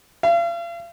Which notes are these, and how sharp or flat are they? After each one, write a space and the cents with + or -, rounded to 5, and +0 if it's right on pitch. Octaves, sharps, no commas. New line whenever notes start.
F5 -40